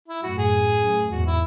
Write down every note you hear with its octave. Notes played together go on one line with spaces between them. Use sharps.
E4
F#2 A2 F#4
G#4
F#2 A2
E2 G#2 F#4
E4